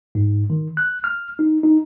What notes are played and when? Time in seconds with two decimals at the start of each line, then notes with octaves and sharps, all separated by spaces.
0.15 G#2
0.50 D#3
0.77 F#6
1.04 F6
1.39 D#4
1.63 D#4